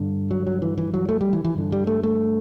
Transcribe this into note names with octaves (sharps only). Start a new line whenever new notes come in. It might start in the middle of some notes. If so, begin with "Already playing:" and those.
Already playing: G2 D3
F#3
F#3
E3
E3
F#3
A3
G3
E3
E3
G2 D3
G3
A3
A3